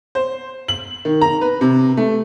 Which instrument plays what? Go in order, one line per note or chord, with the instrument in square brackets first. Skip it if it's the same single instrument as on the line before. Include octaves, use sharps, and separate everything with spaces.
[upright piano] C5
F#7
D#3
A#5
B4
C3
A3